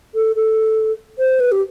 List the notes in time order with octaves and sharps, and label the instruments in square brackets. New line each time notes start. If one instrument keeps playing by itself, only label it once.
[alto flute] A4
A4
C5
B4
G4